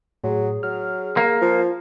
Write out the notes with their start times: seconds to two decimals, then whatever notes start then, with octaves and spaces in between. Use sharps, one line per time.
0.24 A2 F#3 G#4
0.63 F#3 F6
1.17 A#3
1.41 F3 F4